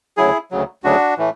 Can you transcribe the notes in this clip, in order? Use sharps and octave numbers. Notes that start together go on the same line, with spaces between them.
D2 C#3 F#3 E4 G#4
D2 C#3 F#3
D2 C#3 F#3 D4 F#4
A2 E3 A3